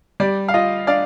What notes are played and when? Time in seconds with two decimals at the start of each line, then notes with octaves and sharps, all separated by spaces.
0.20 G3 D5
0.48 F5
0.54 F4 D#5
0.87 D4 D5 F5